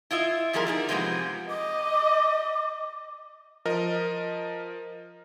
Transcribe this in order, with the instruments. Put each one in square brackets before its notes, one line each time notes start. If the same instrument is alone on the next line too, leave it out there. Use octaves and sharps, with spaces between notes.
[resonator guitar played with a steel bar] E4 F4 D#5 E5
B2 F3 G3 G#4 A#4
D3 D#4 G#4
C3 F3 G#3 A#3 B3
[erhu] D#5 [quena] D6
[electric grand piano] F3 A#4 D#5